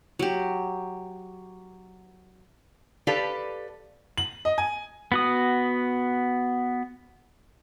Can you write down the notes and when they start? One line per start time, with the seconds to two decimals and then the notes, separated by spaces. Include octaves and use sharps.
0.19 F#3 G4
3.07 G4 A4 B4 D5 F5
4.18 F#7
4.45 D#5
4.58 G#5
5.12 B3 F#4 D#6